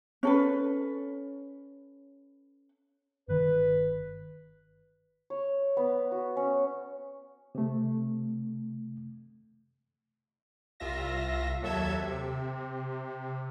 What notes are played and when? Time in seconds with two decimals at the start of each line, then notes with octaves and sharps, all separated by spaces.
0.23 C#4 A4 B4
3.28 G1 D#3 B4
5.30 C#5
5.77 B3
6.12 F#4
6.37 C#4
7.55 C3 A3
10.80 C2 F4 E5 A#6
11.62 D#2 F#3 A4 E5 G#6
12.00 C3